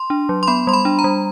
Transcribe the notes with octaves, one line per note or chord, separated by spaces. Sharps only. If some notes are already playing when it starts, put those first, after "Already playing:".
Already playing: C6
D4
F#3
C6
B3 B5
G3 C6
B5
D4
A#5
G3